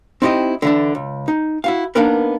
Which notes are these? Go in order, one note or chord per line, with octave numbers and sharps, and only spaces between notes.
C4 D#4 E4 G4 A#4 D#5
D3 E3 D4
C#2
D#4
E4 F#4 F5
A#3 B3 D4 D#4 A#4 B4